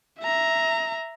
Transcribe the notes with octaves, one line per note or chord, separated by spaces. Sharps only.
E5 A#5